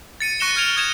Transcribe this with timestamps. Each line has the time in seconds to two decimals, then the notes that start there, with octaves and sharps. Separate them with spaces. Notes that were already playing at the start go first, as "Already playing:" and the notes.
0.20 A6 C#7 D#7
0.40 C#6 F#6 A#6 C#7 E7 G7
0.56 F6 G#6 D7 F7 G7
0.76 D#6 G#6 E7 G7